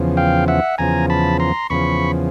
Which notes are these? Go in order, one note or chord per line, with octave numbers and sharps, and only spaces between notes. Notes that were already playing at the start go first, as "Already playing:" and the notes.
Already playing: E2 C#3 F3
F5 G5
E5 F#5
E2 C#3 F3 G#5 A#5
A5 B5
A#5 C6
E2 C#3 F3 B5 C#6